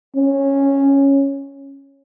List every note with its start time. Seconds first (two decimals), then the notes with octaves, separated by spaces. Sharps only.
0.16 C#4